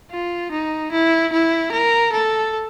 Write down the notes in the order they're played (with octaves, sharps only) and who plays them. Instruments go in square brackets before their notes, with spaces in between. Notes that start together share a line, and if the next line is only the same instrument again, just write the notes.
[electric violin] F4
D#4
E4
E4
A#4
A4